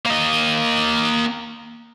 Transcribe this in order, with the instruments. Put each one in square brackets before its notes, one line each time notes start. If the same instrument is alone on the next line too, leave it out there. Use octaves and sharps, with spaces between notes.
[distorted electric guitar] A#3 D#5